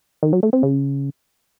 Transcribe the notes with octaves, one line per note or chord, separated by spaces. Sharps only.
D#3
F#3
A3
C4
C#3